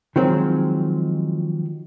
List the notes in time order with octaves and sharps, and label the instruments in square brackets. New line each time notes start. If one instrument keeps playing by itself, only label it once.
[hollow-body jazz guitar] D#3 F3 F#3 G#3 C4